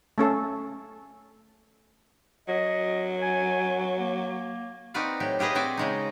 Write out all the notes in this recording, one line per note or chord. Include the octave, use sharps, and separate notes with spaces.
A3 C#4 A4
F#3 D#5
G#5
A#3
C4 D#4 F#4 B4 D5 F5
A2 F#3 G4
F4 G4 G#4 B4 D#5
C4 F#4 C5 D5 E5
C#3 G#3 D#4